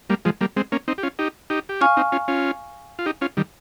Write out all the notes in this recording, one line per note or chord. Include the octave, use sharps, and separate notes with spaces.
G3 A#3
F3 G#3
G3 A#3
G#3 C4
A#3 C#4
C4 D#4
G4
C#4 F4
D#4 G4
D#4 G4
G4
C#4 F4 F5 G#5 C#6 F6
C4 D#4
C#4 F4
C#4 F4
F4
D#4 G4
C#4 F4
D#3 G3